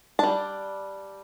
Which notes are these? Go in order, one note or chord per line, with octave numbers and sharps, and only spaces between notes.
G3 D4 A5